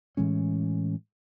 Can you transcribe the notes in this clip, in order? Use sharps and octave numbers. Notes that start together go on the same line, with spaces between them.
A2 E3 G#3 C#4